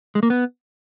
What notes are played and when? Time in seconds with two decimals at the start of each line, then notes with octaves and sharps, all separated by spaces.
0.15 G#3
0.23 A#3
0.30 B3